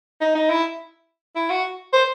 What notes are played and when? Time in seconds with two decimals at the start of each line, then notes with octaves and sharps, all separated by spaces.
0.21 D#4
0.35 D#4
0.50 E4
1.36 E4
1.50 F#4
1.93 C5